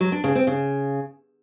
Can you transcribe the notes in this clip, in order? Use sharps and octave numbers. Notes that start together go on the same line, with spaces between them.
F#3
D4
C#3
C4
C#3